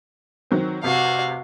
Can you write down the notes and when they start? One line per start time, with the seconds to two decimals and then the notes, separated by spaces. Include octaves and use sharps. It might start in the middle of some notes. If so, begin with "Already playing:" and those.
0.51 D#3 F#3 C4
0.83 F1 C3 F#4 F5 C7